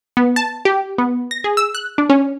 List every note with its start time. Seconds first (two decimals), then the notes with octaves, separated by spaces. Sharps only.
0.17 B3
0.36 A5
0.65 G4
0.98 B3
1.31 A#6
1.44 G#4
1.57 E6
1.75 F#6
1.98 D4
2.10 C#4